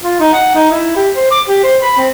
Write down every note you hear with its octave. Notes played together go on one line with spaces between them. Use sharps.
F4
D#4
F#5
D#4
E4
G4
C5
D6
G4
C5
B5
C4